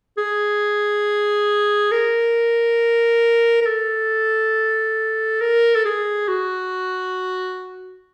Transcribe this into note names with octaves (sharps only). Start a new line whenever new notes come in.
G#4
A#4
A#4
A4
A#4
A4
G#4
F#4